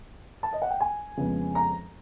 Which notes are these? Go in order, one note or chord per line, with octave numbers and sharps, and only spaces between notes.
A5
D#5
F#5
G5
G#5
F2 C#3 F3 G#3 B3
A#5